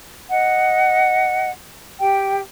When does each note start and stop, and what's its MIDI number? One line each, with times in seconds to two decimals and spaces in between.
0.30 1.50 75
0.30 1.50 78
2.00 2.39 67
2.00 2.39 79